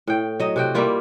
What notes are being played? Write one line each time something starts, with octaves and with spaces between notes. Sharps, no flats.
A2 G5
F#3 D#5
C3 F#4 G5
G3 A#3 E4 F4